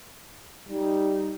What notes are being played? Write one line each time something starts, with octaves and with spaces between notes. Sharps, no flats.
G3 D#4